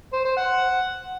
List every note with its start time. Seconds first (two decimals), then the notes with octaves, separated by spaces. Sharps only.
0.13 C5
0.25 C5
0.37 F#5